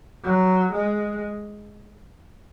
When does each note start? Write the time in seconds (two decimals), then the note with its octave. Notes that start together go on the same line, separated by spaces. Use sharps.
0.24 F#3
0.73 G#3